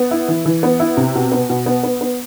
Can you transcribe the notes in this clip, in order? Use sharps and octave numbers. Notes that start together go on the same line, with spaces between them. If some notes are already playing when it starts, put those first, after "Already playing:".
Already playing: B3
E4
E3
E3
B3
E4
C3
B2
B3
B2
B3
B3
B3